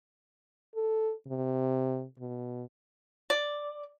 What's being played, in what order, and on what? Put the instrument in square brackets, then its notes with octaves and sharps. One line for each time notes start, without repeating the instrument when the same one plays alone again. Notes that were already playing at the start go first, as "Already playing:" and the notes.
[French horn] A4
C3
B2
[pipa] D5